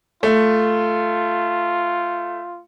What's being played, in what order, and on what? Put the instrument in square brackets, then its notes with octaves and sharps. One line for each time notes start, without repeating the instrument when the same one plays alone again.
[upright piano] A3 [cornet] F4